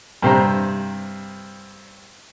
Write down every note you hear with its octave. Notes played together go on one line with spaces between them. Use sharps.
G2 C3 C5 A#5